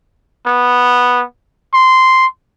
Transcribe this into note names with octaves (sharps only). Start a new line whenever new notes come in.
B3
C6